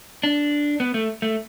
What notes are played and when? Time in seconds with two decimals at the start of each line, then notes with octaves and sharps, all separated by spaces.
0.23 D4
0.80 B3
0.94 A3
1.22 A3